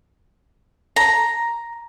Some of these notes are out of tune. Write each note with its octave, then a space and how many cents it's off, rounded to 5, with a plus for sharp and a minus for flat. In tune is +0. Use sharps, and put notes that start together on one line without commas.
A#5 +5